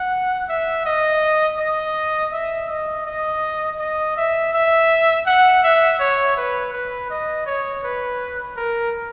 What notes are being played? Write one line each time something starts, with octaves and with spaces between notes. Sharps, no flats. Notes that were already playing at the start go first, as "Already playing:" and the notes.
Already playing: F#5
E5
D#5
D#5
E5
D#5
D#5
D#5
E5
E5
F#5
E5
C#5
B4
B4
D#5
C#5
B4
A#4